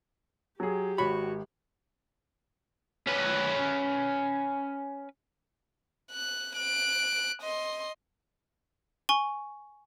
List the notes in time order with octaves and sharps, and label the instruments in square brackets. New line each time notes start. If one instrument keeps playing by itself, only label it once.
[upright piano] F#3 G#4 [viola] G4
[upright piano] G#1 C#5 [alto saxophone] F#4 [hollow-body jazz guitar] B5
[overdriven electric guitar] C#4 B4
[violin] F#6
F#6 D7
D#5 C6
[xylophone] G#5 C#6 G7